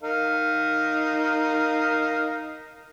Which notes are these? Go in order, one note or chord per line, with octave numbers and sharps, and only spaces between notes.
D#4 A#4 F5